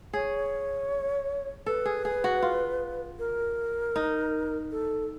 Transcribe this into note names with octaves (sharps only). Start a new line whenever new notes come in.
G#4 C#5
A4 B4
G#4
G#4
F#4
F4
A#4
D#4
A4